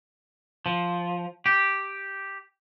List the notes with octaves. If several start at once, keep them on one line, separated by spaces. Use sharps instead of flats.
F3
G4